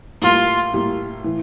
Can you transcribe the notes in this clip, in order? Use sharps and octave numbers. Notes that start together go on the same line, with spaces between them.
A2 G3 A#3 F4
A2 G3 A#3
A2 E3